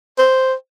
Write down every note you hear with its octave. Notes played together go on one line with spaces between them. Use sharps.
C5